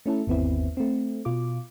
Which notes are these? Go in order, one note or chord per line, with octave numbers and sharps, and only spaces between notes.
A3 C#4 E4 A4
G1 D#2 B3 C4 E4
A3 C4
B2 F4 D6